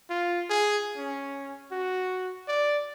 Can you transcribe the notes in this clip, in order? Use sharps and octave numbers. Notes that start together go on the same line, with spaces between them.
F4
G#4
C#4
F#4
D5